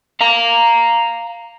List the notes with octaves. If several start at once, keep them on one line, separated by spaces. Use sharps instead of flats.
F5 A#5